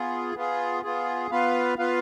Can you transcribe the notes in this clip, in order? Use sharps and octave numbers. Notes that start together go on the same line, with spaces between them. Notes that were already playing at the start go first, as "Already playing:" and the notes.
Already playing: B3 F4 G#4
B3 F4 G#4
B3 F4 G#4
B3 F4 B4 F5
B3 F4 B4 F5